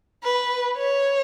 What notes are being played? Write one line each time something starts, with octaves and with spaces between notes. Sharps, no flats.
B4
C#5